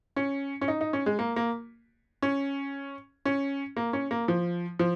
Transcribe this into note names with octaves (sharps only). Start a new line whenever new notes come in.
C#4
C#4
D#4
D#4
C#4
G#3
A#3
A#3
C#4
C#4
A#3
C#4
A#3
F3
F3